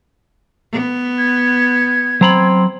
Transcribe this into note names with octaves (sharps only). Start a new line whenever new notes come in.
B3
G#6
F#3 C4 A#5 B5